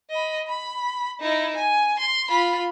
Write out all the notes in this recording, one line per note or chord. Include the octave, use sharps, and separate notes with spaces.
D#5 B5
B5
D#4 E4
G#5
C6
F4 B5